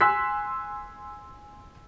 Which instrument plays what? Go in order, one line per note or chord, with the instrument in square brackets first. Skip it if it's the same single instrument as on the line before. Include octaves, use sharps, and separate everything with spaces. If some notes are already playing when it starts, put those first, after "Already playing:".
[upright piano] G#5 C6 E6 F#6 B6